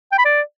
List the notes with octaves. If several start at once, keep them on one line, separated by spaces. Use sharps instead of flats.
G5
B5
D5